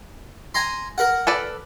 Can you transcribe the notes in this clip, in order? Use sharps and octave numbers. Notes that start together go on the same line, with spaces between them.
G#5 A#5 C6
A#4 F#5
A4 B4 D5